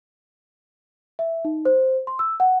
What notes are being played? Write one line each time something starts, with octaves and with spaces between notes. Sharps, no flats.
E5
D#4
C5
C6
E6
F#5